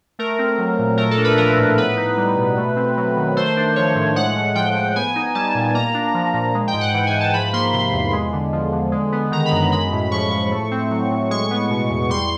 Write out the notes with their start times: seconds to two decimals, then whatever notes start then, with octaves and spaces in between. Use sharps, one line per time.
0.19 A3 A#4
0.39 C4
0.58 F#3
0.79 A#2
0.98 A3 A#4
1.11 A4
1.18 D4
1.24 B4
1.38 F3 A#4
1.57 A2
1.78 B3 B4
1.97 D#4
2.17 G3
2.37 B2
2.57 A3
2.76 C4
2.97 F#3
3.17 D#3
3.36 A3 C5
3.57 D4
3.76 F3 C#5
3.95 A2
4.16 G#3 F#5
4.36 A2
4.55 F3 G5
4.76 A2
4.96 B3 G#5
5.16 D#4
5.35 G3 A5
5.55 A#2
5.74 A#3 A#5
5.94 D4
6.14 F3
6.34 A#2
6.55 G#3
6.68 G5
6.74 G#2
6.81 F#5
6.94 E3
7.07 G#5
7.14 G#2
7.21 A5
7.34 F3 B5
7.53 A#3 C6
7.73 C3
7.93 E2
8.13 G#3
8.33 D3
8.53 F3
8.72 D3
8.92 G#3
9.12 B3
9.32 D#3 A#5
9.46 B5
9.52 F#2
9.72 G#3 B5
9.92 A2
10.12 F3 C#6
10.31 A2 C#6
10.51 A3
10.71 C4
10.91 F#3
11.11 A2
11.31 G#3 C#6
11.51 B3
11.70 B2
11.90 E2
12.10 G3 C6